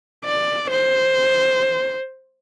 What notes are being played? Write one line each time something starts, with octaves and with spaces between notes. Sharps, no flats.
D5
C5